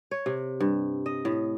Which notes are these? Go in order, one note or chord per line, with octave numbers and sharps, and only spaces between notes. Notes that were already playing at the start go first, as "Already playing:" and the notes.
C#5
C3
G2
D#5
A2